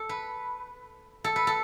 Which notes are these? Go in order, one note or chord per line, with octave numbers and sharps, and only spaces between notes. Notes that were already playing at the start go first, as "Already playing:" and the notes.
Already playing: A4
B4
A4
B4
A4